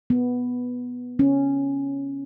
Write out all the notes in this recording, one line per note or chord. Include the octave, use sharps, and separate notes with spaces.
B3
C#4